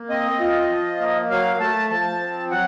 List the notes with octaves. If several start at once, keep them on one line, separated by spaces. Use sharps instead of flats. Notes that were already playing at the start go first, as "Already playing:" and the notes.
Already playing: A#3
C4 D#5
F4
F3
A#3
F#3 F5
A3 A5
F3 A5
C4
F#3 F#5